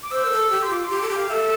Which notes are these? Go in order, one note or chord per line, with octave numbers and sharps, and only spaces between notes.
D6
C5 E6
A#4
A4
G4
C6
F4 D6
G4 C6
A4 D6
G4
F5
A4 E5